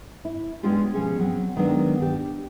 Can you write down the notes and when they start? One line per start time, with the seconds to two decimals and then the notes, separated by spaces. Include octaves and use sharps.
0.25 E4
0.63 G#3 B3 C#4 D4 F4 G4
0.94 B2 F3 C#4 G#4
1.20 F#3 C4
1.57 D#3 F#3 G#3 A#3 B3 D4
2.00 D4 G4